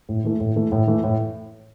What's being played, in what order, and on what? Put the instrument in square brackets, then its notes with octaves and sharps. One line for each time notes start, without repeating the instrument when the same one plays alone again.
[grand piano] A2
E3 A3
A2
E3 A3
A2
E3 A3
A2